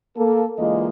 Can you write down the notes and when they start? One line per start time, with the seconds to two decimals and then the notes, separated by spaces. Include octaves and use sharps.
0.16 A#3 A4
0.58 D2 E3 G#3 A#3 F4 D#5